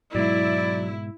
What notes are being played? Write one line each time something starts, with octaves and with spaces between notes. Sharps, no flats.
G#2 B2 F#3 G#3 E4 D5